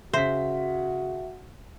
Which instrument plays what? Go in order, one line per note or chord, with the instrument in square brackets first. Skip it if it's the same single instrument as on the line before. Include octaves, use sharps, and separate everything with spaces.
[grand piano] C#3 B6 [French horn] F#4 [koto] C5 [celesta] E5